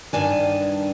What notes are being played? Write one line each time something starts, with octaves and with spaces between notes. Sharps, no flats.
G2 D#3 D4 G#5